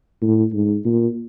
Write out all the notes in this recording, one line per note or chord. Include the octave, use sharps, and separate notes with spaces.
A2
G#2
A#2